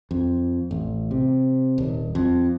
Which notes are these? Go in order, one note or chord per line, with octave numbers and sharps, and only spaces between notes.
F2
A1
C3
D#1
F2